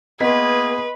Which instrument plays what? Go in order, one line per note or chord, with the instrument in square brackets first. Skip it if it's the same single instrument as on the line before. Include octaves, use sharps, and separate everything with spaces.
[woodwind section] E3 A#3 G#4 [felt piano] B3 B6 [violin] B4 [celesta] D#5 C6